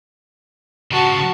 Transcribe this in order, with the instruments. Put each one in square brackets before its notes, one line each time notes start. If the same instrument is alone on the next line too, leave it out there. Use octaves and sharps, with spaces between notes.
[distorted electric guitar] C#3 F3 [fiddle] F#4 A5